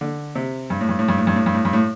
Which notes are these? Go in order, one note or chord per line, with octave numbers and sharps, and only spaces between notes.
D3
C3
G2
A2
G2
A2
G2
A2
G2
A2
G2
A2
G2
A2